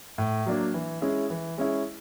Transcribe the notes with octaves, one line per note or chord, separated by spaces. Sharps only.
A2
F#3 A#3 D4
E3
G#3 C#4 E4 G#4
E3
G#3 C#4 E4 G#4